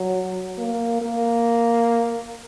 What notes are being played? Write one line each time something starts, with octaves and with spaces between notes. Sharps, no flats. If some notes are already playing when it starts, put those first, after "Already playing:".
Already playing: F#3
A#3
A#3